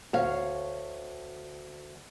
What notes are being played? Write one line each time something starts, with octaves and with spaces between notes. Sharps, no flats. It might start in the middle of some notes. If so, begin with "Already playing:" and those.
D2 C#5 F5